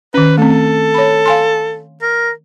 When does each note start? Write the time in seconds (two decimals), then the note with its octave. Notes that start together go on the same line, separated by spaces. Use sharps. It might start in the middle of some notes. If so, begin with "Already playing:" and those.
0.14 D#3 C#4 B4
0.38 A3 C4 A4
0.94 C#5 B5
1.26 F5 G#5 C6
2.02 A#4